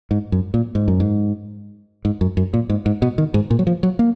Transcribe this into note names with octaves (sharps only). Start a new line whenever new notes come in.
G#2
F#2
A#2
G#2
F#2
G#2
G#2
F#2
F#2
A#2
G#2
G#2
B2
D#3
G#2
A#2
F#3
F3
F#3
A#3